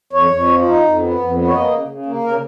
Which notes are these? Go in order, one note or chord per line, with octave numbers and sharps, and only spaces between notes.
F2 C#5
F2
F3
D#4
F2
B3
F2
B3
C#5
A#3 D#5
C#3
C#3
A#3
C#3 A#4